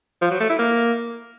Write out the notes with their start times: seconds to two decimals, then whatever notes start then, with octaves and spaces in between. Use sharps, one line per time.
0.22 F3
0.31 F#3
0.40 A3
0.50 E4
0.59 A#3